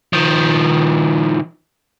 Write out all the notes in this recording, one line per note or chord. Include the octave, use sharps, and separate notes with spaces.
D#3 F3